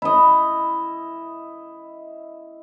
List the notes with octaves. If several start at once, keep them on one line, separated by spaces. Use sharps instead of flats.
E4 D#5